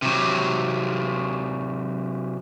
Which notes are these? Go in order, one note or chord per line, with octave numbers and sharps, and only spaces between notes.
C3 F#3